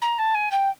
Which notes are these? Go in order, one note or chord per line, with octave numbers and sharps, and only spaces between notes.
A#5
A5
G#5
G5